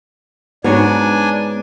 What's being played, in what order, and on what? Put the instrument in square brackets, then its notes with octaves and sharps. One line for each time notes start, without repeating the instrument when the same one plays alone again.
[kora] G#2 F#3 C#5 [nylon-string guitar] B3 [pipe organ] D4 G#5